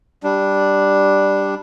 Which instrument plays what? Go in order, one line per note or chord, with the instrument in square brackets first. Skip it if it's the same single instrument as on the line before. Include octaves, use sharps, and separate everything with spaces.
[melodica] G3 D4